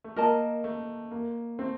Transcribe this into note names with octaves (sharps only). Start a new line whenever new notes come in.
A3
A#3 A#4 D#5 A5
A3
A#3
A3 C4